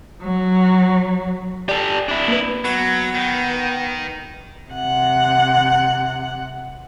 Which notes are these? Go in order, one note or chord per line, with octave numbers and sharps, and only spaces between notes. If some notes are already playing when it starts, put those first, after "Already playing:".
F#3
G4 A4 D5 A5
D4 E4
A#3 B4
F#3 B3
D#3
C3 F#5